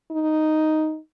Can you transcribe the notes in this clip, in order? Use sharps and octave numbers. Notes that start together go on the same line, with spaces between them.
D#4